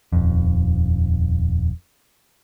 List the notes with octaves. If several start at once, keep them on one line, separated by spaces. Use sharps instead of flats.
D#1 F2